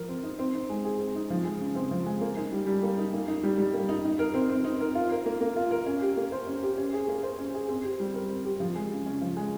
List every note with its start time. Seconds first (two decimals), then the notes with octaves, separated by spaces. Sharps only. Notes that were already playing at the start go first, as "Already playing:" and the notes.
Already playing: F3 A#4
0.08 C4
0.23 D#4
0.39 C4
0.54 D#4
0.70 G#3
0.85 G#4
1.00 C4
1.15 D#4
1.30 F3
1.45 G#3
1.61 C#3
1.75 C4
1.91 F3
2.06 G#3
2.21 A#3
2.37 D#4
2.52 G3
2.67 G3
2.83 A#3
2.98 D#4
3.13 A#3
3.28 D#4
3.43 G3
3.58 G3
3.74 A#3
3.89 D#4
4.05 D#4
4.19 A#4
4.34 C4
4.50 C4
4.64 D#4
4.80 A#4
4.95 F4
5.11 A#4
5.26 A#3
5.41 A#3
5.56 F4
5.71 A#4
5.86 C#4
6.02 G4
6.17 A#3
6.32 C5
6.47 C#4
6.63 G4
6.78 C#4
6.93 G#4
7.08 A#3
7.23 C5
7.39 C#4
7.54 G#4
7.69 C4
7.84 G4
8.00 G3
8.14 A#4
8.30 C4
8.45 G4
8.60 F3
8.75 G#3
8.91 C#3
9.06 C#4
9.21 F3
9.36 G#3